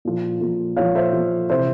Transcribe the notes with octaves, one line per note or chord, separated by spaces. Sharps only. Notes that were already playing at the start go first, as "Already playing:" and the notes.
A#2 F3
A#2 F3
A#2 F3 C#5 F5
C5 E5
A#2 F3
C3 E3 C5 E5